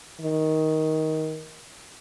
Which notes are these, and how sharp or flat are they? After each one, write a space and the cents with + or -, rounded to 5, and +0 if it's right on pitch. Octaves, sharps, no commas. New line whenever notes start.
D#3 +15